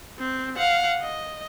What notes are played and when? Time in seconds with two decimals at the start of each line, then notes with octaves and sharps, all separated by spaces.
0.18 C4
0.56 F5 F#5
1.01 D#5